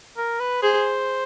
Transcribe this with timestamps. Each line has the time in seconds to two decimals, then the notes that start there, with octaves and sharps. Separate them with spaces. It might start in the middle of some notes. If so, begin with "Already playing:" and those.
0.17 A#4
0.40 B4
0.62 G#4 C5